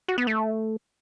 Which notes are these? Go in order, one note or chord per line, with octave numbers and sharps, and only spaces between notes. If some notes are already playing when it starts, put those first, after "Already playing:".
F#4
B3
A3